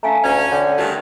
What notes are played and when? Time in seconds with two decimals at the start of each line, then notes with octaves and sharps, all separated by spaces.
0.03 A3 F5 G#5 A#5
0.24 D2 C#4
0.52 D3 C#5 G5
0.79 G2 D#3 A3 G4